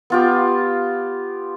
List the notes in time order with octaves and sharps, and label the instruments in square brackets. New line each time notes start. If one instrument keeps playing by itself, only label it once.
[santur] B3 F4 G4